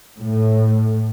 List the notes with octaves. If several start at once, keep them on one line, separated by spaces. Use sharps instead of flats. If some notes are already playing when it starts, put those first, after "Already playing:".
A2